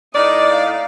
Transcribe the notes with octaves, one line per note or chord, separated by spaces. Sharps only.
A2 D#4 D5 D#5
F5